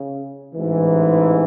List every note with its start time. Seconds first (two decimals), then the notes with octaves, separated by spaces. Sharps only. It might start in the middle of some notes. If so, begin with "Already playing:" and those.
Already playing: C#3
0.55 A1 G#2 E3